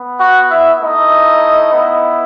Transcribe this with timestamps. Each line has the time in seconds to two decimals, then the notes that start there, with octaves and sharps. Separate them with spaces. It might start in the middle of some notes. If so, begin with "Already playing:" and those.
Already playing: B3
0.20 F#4 F#5
0.51 E4 E5
0.80 A3 D#4 E4 D#5
1.73 B3 E4